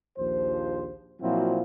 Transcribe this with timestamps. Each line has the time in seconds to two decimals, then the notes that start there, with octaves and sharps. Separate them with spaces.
0.16 A#1 D#2 F3 C5
1.21 A#2 F3 F#3 C4 E4 F#4